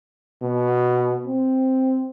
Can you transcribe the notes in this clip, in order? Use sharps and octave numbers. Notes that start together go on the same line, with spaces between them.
B2
C4